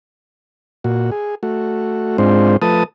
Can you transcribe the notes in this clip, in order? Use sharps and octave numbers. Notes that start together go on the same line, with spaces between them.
A#2 F#4
G#4
A3 F#4
G#2 G#3 C4 D4 F4 C5
F3 A3 B4 A5 D#6